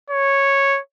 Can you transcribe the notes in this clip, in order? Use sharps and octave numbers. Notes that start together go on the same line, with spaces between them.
C#5